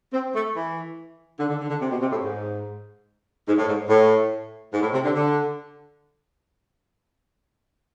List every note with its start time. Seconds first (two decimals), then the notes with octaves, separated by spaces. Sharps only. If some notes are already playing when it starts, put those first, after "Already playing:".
0.13 C4
0.35 A3
0.55 E3
1.39 D3
1.49 D3
1.59 D3
1.70 D3
1.81 C3
1.91 B2
2.02 C3
2.12 A2
2.23 G#2
3.48 G#2
3.57 A2
3.68 G#2
3.89 A2
4.73 G#2
4.82 A2
4.93 C3
5.04 D3
5.14 D3